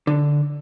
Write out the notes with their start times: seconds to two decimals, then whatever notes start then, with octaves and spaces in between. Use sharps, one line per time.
0.07 D3